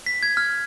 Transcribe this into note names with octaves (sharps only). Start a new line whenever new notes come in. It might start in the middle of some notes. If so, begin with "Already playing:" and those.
B6
G#6
F6